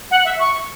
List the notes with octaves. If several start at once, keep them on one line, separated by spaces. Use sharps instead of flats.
F#5
E5
C#6